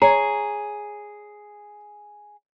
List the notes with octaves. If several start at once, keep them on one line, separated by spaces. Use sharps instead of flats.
G#4 C#5 A#5